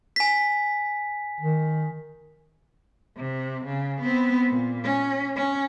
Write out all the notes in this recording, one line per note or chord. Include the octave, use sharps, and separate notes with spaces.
G#5 B6
D#3
C3
C#3
B3 C4
A#2
C#4
C#4